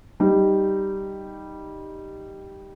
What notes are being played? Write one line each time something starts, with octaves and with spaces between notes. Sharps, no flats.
G3 D#4